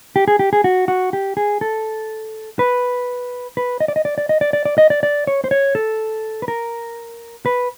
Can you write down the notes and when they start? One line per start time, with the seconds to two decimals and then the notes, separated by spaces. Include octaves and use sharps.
0.16 G4
0.28 G#4
0.39 G4
0.53 G#4
0.64 F#4
0.88 F#4
1.13 G4
1.37 G#4
1.61 A4
2.59 B4
3.57 B4
3.80 D#5
3.88 D5
3.96 D#5
4.05 D5
4.18 D5
4.29 D#5
4.41 D5
4.53 D5
4.65 D5
4.78 D#5
4.90 D5
5.03 D5
5.27 C#5
5.44 C5
5.51 C#5
5.75 A4
6.42 B4
6.48 A#4
7.46 B4